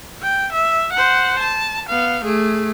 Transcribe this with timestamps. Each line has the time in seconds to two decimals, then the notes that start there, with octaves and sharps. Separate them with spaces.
0.22 G5
0.52 E5
0.93 C5 F#5
1.39 A5
1.89 B3 F5
2.24 A3 G#4